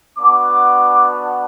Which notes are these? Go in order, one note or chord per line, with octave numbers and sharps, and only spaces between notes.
B3 D4 F#4 D6